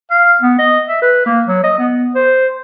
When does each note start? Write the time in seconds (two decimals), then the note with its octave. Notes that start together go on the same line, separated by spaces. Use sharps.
0.11 F5
0.41 B3
0.58 D#5
0.88 E5
1.02 B4
1.26 A#3
1.47 F#3
1.64 D#5
1.78 B3
2.15 C5